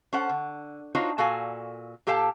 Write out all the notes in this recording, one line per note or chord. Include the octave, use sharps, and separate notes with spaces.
C#4 A4 C5 F#5
D3
D4 D#4 F4 F#4 C5 C#5
A#2 F#4 A4 D5 F5 G#5
A#2 G4 A4 F5 G5 A5